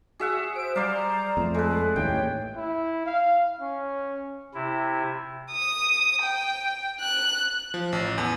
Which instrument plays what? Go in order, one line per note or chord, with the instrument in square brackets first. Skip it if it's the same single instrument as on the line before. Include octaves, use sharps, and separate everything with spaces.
[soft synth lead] F#4 [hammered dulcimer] G#4 E5 F#5
[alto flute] C5 [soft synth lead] D7
[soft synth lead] G3 [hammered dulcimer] C5 D5 F5 [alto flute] A#5
[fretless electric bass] F2 [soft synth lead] A3
[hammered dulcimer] G#3 B4 [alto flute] A4
[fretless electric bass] A1 D#2 A2 [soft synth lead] A#3 [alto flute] C#5 [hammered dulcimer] G5
[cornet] E4
F5
C#4
[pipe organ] C3 E4
[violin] D#6
G5
F#6
[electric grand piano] F3
A1
E2